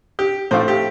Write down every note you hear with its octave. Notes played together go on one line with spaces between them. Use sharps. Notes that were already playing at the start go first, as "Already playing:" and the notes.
G4
A2 A3 F4 C5
G4